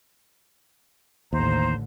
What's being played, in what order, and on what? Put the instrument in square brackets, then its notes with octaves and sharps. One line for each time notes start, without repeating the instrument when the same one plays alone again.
[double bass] A1 D3 [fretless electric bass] D#2 [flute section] C5 A#5